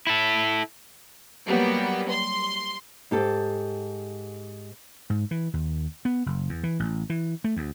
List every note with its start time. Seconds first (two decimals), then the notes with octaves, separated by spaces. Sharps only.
0.07 E4 A4
1.48 F#3 G3 A#3 B3
2.10 C6
3.11 G#2 G4 A4
5.10 G#2
5.31 E3
5.53 D#2
6.05 B3
6.26 F#1
6.49 E2
6.63 E3
6.80 A1
7.10 E3
7.44 A3
7.56 D2